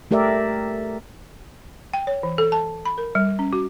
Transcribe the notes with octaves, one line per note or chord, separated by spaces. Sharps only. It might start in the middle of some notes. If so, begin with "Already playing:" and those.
A3 G4 A#4 D5 E5
G5
C#5
E3
A4
A5
B5
A#4
G3
C#4
F#4